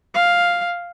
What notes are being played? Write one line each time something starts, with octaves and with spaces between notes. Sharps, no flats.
F5